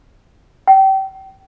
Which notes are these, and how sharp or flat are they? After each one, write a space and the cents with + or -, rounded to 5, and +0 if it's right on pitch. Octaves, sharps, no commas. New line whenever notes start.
G5 -30